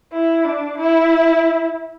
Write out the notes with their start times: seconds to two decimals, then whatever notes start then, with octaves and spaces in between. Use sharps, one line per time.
0.13 E4
0.45 D4
0.77 E4